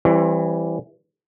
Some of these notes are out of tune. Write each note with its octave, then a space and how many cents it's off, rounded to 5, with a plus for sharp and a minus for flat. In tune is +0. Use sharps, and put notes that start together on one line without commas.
E3 +10 G3 +0 C4 +35